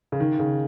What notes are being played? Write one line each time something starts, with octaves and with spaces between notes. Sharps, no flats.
C#3
D#3
C#3